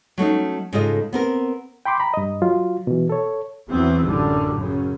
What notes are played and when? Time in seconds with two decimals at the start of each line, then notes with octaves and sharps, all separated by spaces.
0.18 F#3 A3 C#4 D#4
0.73 G#2 C#3 F4 A4 D#5
1.13 B3 C4 A#4
1.85 G5 B5 C6 D6
2.00 A#5 B5
2.14 G2 D#5
2.42 F#3 F4
2.87 B2 E3
3.10 A4 C#5
3.69 E2 E3 F#3 B3 C4
4.03 A1 F#2 A2 D3 G3
4.56 F#2 C#3